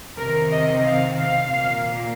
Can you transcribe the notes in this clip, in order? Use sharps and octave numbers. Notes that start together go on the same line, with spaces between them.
C3 D#3 C4 A#4
D#5
F5
F5
A#2 A#3